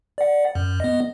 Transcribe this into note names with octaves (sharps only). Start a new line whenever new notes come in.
D5 F#5
F#2
B3 D#5